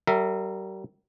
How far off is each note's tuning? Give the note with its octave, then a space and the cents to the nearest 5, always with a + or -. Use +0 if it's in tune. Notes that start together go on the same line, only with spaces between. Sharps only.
G3 -40 A#4 -30 E5 +0